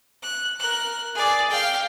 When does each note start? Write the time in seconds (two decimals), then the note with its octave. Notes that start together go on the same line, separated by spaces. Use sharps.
0.23 F#6
0.59 A#4 F#6
1.15 G#4 D5
1.50 F5 G5